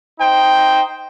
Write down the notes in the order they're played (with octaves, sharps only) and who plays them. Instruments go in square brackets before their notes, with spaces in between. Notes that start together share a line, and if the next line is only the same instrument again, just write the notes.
[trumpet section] D#4 C5 G5